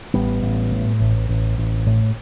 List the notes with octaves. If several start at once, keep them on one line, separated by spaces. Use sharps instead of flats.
A1 G3 B3
A1
A2
A1
A1
A1
A2